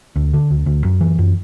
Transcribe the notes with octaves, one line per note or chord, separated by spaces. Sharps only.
D2
D3
D2
D2
F#2
E3
F#2